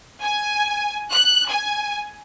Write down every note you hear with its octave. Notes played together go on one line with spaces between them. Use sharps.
G#5
F#6
G#5